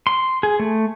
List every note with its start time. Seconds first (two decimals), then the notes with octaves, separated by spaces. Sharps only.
0.07 C6
0.43 G#4
0.60 A3